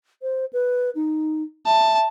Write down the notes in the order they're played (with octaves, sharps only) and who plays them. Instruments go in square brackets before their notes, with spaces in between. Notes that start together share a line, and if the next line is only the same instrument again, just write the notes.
[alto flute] C5
B4
D#4
[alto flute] E5 [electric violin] A5